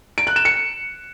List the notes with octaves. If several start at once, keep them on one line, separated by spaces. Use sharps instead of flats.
D7
F#6
E7
C#7